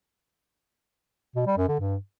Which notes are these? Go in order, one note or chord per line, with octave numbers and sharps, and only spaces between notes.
B2
G3
F#2
D3
G2